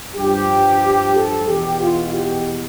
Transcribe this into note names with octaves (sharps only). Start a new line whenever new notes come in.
G2 F3 G4
A4
E2 B2 G4
F4
G4